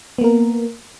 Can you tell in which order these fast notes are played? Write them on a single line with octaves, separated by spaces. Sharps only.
B3 A#3 A#4